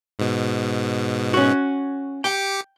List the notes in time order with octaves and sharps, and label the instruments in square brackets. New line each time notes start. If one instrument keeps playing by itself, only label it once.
[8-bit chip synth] G#2 B2
[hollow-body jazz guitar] C#4 F#4
[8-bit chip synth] G4 D6 C#7 [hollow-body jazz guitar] G5